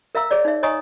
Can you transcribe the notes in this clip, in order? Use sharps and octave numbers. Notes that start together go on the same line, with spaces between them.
A#4 E5 F5 A#5 E6
G#4 C#5 D5
D#4 E5
C#5 D#5 G#5 A#5 C#6 D#6